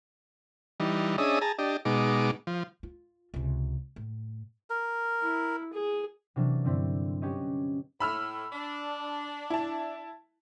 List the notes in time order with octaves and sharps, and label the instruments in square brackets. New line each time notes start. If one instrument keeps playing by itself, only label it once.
[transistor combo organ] E3 G3 D#4
C#4 D4 G#4 D#5 E5 D#6
G#4 A5 A#5
D4 G4 D#5
B2 G#3 D#4 D6
F3
[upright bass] F4
C#2 C3
A2
[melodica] A#4
[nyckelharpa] E4
G#4
[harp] C3 E3 F#3 D4 A#4
G2 D3 C4 E4 D5
C#4 F#4 G4 B4 C#5 D#5
[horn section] A2 [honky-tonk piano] B5 E6 F6
[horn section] D4
[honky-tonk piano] E4 A5